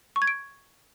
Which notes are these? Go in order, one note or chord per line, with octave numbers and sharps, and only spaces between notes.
C#6
G#6
D7